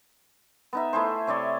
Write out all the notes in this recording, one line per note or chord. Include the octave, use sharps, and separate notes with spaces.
B3 D#4 E5
A3 E4 G#4 C5
C3 C#5 D5 C6